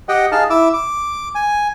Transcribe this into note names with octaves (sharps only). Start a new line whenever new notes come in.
G4 D#5 F#5 G5
D#4 G#4 F5 A5 F6
E4 D6 E6
D6
G#5